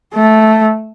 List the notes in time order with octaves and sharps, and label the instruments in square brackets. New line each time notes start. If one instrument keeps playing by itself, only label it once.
[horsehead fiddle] A3